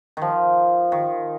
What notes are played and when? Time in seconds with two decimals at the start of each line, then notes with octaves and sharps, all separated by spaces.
0.17 D#3 F3
0.92 D#3